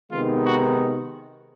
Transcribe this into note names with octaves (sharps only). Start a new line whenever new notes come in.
C3 D#3 G#3 B3 D#4 F4
F#4